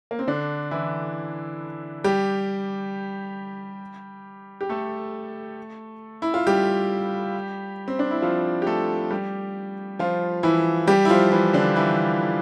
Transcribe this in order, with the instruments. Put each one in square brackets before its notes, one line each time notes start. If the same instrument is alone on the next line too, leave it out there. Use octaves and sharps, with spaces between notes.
[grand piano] A#3
C4
D3 D4
E3 E4
G3 G4
G4
A3 A4
E4
F4
G3 G4
C4
D4
E4
F3 F4
G4
A3 A4
G3 G4
F3 F4
E3 E4
G3 G4
E4
F3 F4
E3 E4
D3 D4
E3 E4